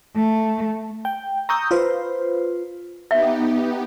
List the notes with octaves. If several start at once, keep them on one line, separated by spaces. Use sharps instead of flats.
A3
G5
A#5 C#6 D#6 E6 G6
F4 B4 C5
B3 D#4 G4 E5